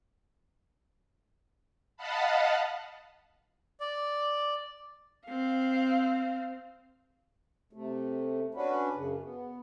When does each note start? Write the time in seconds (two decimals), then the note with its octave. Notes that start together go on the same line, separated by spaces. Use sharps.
1.97 D#5 F5 F#5 A5 B5
3.80 D5
5.26 C4 F5
7.73 C3 A3
8.54 C#4 D4 F#4 B4
8.95 F#2 C#3
9.22 B3